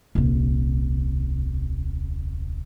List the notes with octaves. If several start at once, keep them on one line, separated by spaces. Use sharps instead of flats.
D#1 C2